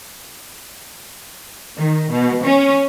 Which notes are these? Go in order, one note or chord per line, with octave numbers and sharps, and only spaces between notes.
D#3
B2
C#4